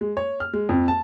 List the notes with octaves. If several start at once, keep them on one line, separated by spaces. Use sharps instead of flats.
G#3
C#5
F6
G#3
F2
A5